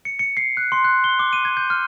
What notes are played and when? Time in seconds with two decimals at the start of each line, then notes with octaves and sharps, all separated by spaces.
0.05 C#7
0.19 C#7
0.37 C7
0.57 F#6
0.72 C6
0.84 F#6
1.04 G7
1.19 D6
1.33 D#7
1.45 G#6
1.57 G6
1.70 F6